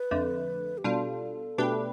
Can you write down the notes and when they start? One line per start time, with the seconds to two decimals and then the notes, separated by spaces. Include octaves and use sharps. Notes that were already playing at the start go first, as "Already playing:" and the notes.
Already playing: B4
0.11 F2 D3 A3
0.78 G4
0.84 B2 G3 D4 F4 A4
1.58 B2 A3 D4 G4 B4